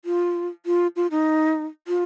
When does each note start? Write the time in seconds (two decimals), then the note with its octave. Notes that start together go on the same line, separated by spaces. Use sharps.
0.05 F4
0.66 F4
0.96 F4
1.11 D#4
1.88 F4